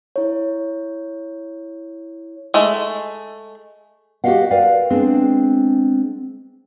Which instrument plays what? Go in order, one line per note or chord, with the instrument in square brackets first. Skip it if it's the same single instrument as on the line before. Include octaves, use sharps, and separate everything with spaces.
[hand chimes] E4 C#5
[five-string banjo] G#3 A3
[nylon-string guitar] F#4 G4 C#5 D#5 F5 F#5
A#4 B4 D5 F5 G5
G#3 B3 C4 D4 G#4